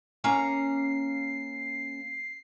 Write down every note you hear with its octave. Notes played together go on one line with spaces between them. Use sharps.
A#3 C#4 A#5 C7